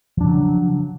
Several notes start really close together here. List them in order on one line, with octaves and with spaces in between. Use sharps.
F3 D4 C#3 F#3